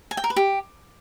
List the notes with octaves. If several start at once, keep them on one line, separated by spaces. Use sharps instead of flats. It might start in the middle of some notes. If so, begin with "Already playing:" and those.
G#5
G5
A#4
B4
G4